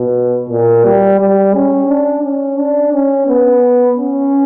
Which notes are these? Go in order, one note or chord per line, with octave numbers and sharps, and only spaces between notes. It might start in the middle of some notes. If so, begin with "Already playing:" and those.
Already playing: B2
A#2
G3
G3
C#4
D4
C#4
D4
C#4
B3
C#4